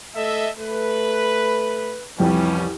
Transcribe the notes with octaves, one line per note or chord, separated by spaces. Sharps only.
A3 A4 D#5 E5
A3 B4
C2 F2 E3 G3 C#4 G5